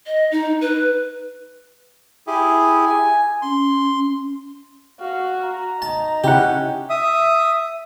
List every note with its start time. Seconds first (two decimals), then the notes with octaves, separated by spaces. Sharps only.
0.06 D#5
0.32 D#4
0.61 B4
2.27 E4 G4 G#4
2.85 G#5
3.42 C#4 C6
5.00 F#4 F5
5.43 A#5
5.82 D#4 A5
6.24 C#3 C#4 E4 G4 F#5
6.90 E5 D#6